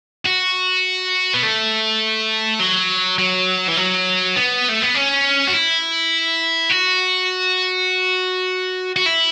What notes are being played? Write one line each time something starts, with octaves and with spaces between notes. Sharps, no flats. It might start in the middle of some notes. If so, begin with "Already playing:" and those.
F#4
B3
A3
F#3
F#3
E3
F#3
B3
A3
B3
C#4
F#4
E4
F#4
F#4
E4